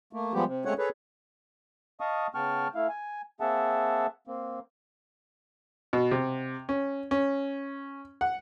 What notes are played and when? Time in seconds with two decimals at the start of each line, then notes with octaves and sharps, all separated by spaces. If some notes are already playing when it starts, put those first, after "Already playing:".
0.13 A3 A#3
0.34 F3 G3 G#3 B3 G4
0.46 C3
0.65 G#3 A3 C4 C#4 C#5 F#5
0.78 G#4 A4 B4 C#5
2.00 D#5 F5 A5 C#6 D#6
2.35 C#3 B3 G5 A5 C#6 F6
2.75 A3 E4 F5
2.89 G#5
3.40 A#3 C4 G#4 E5 F#5 A5
4.27 A#3 C4
5.93 B2
6.11 C3
6.69 C#4
7.11 C#4
8.21 F#5